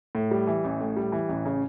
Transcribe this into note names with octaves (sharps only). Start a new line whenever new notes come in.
A2
G3
E3
A1
A2
G3
E3
A1
C#3